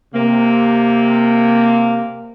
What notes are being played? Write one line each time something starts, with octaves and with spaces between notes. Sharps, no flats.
C3 A#3